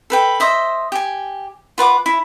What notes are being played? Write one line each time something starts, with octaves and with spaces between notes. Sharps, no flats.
A4 B4 G5
C5 D#5 E5
G4 G#5
F4 B4 F#5 D6
E4